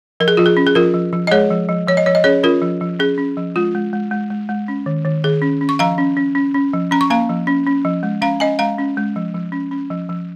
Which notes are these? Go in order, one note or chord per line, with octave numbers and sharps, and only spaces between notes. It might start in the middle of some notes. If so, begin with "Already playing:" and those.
F3 A#4
G#4
F3 F4
G#4
C#4
G#4
F3 F4 A#4
F3
F3
D#5
G#3 G#4 C#5
F3
F3
F3 C#5
D#5
F3 C#5
D#5
C#4 G#4 C#5
C#4 F4 A#4
F3
F3
C#4 G#4
C#4
F3
G#3 F4
G#3
G#3
G#3
G#3
G#3
C#4
D#3
D#3
D#3 G#4
C#4
C#4
C#6
F3 F5 A#5
C#4
C#4
C#4
C#4
F3
C#4 A#5
C#6
A#3 F5 A#5
F3
C#4
C#4
F3
G#3
C#4 F5 A#5
C#4 D#5 G#5
G#3 F5 A#5
C#4
G#3
F3
F3
C#4
C#4
F3
F3